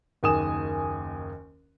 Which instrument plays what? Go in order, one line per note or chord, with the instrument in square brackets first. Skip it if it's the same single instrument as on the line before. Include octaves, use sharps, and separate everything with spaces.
[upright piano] F#1 D#2 G#5 D#6 E7